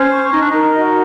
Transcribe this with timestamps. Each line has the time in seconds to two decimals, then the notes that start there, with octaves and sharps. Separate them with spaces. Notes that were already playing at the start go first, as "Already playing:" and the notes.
Already playing: C#4 C5
0.11 C#6
0.33 D#4 D#5
0.42 D4
0.51 D#4 A#4
0.76 F#4